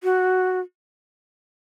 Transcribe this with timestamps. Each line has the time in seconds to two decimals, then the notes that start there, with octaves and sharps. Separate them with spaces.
0.04 F#4